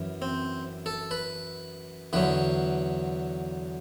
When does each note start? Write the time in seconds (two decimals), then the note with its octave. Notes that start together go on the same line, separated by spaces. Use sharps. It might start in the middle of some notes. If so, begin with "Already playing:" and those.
Already playing: F#2 E3
0.22 C4
0.86 A4
1.11 B4
2.13 E2 D3 F#3 B4